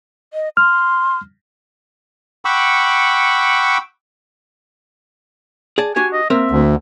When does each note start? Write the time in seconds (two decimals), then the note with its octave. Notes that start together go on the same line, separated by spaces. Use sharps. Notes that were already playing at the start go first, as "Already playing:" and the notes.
0.34 D#5
0.57 C6 F6
2.45 F#5 G5 B5 C#6 D6 E6
5.78 G#4 D5 A5
5.96 D4 F#4 G4 G#5
6.13 D#5
6.30 A#3 C4 A#4 E5
6.51 D2